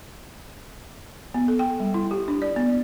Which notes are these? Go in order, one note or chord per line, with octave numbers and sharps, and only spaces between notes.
B3
A4
G5
G3
E4
G4
D4
D5
B3